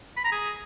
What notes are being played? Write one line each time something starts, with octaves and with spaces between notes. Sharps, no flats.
B5
A#5
G#4